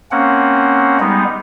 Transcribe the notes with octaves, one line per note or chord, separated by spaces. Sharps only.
A#3 C4 C#4 F#5
G3 G#3 B3 D#4